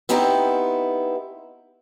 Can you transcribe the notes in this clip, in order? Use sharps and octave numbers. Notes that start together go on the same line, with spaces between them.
B3 C4 D#4 E4 G4